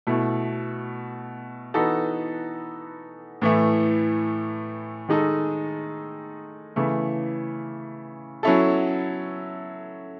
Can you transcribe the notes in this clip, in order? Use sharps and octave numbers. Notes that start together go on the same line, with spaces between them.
B2 A3 E4
E3 B3 D#4 F#4 A4
A2 E3 A3
D#3 G#3 D#4 A4
C#3 E3 A3
F#3 C#4 E4 A4